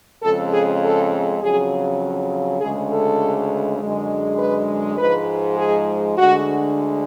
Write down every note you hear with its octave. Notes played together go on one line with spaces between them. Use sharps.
F2 C#3 G#3 A4
G#4
A4
F2 C#3 F#3 G#4
D2 C#3 G#3 G#4
A4
F#2 D3 G#3
B4
G#2 F3 G#3 B4
G#4
D2 D3 G#3 F#4